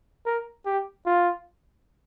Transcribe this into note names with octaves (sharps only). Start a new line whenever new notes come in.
A#4
G4
F4